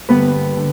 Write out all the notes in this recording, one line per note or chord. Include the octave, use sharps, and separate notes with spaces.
G2 D3 G3 B3 B4
D3